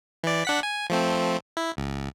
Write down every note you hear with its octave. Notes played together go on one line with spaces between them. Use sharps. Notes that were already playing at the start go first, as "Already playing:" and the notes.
E3 D5
D4 F#5 B6
G#5
F3 A3 C4
E4
C#2